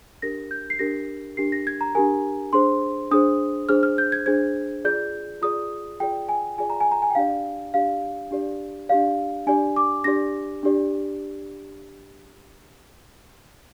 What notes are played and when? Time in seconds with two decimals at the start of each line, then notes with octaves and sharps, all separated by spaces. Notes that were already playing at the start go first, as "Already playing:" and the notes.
0.22 D4 G4 A#4 A#6
0.51 G6
0.70 C7
0.79 D4 G4 A#4 A#6
1.37 D4 G4 A#4 C7
1.52 A#6
1.67 G#6
1.81 A#5
1.95 D4 G4 A#4 G#5
2.53 D4 G#4 C5 C6
3.11 D4 G#4 C5 D#6
3.69 D4 G#4 C5 F6
3.83 F6
3.98 G6
4.12 G#6
4.26 D4 G#4 C5 G#6
4.85 F4 G#4 D5 G6
5.42 F4 G#4 D5 D#6
6.00 F4 G#4 D5 G5
6.29 G#5
6.58 F4 G#4 D5 G#5
6.70 A#5
6.81 G#5
6.92 A#5
7.02 G#5
7.10 G5
7.15 D4 G4 D5 F5
7.74 D4 G4 D5 F5
8.31 D4 G4 D5
8.89 D4 G4 D5 F5
9.46 D4 G4 D5 G#5
9.76 D6
10.04 D4 G4 D5 A#6
10.63 D4 G4 D5